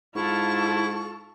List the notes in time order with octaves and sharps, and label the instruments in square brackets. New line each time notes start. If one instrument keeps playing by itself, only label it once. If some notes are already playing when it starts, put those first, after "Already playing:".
[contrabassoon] G#2 [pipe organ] E4 [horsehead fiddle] F4 A4 [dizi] C#6